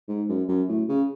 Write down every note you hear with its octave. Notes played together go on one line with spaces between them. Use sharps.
G#2
F#2
F#2
A2
C#3